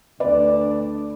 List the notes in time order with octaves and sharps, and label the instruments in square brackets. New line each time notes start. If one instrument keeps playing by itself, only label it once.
[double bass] D2 D4 [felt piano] B4 D5